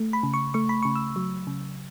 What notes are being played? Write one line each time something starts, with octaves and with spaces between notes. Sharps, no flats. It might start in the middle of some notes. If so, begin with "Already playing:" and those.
Already playing: A3
B5
C#3
C#6
A3 C#6
B5
C#3 C#6
E6
F#3
C#3